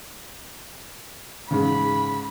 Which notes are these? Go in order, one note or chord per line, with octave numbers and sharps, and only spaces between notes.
G#2 C#3 B5